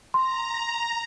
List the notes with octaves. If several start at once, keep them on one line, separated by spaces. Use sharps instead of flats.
A#5 C6